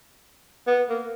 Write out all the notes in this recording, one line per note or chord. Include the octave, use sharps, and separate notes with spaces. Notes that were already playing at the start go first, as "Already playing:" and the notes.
B3
A#3